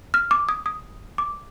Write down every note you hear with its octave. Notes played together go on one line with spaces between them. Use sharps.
F6
D6
D#6
D#6
D6